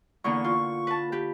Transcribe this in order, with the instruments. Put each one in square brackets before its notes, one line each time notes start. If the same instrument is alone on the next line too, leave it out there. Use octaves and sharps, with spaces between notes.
[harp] E2 D3 A#3 [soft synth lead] C#6
[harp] F4
B4 A5
G4 B4